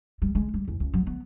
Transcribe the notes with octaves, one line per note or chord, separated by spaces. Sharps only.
G3
G#3
G3
E2
C#2
F#3
B3